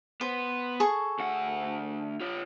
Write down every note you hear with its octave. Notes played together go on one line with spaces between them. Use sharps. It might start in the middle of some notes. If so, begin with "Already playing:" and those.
B3 C5
G#4 A4 C#6
D2 F#5
F4 C#5